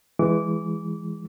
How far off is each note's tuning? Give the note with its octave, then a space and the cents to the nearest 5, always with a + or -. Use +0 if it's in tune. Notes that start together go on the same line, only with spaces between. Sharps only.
E3 +10 G#3 -10 D6 -25